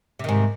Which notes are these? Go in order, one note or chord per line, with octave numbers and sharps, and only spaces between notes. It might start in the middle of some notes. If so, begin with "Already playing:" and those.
G#2 C3 D#3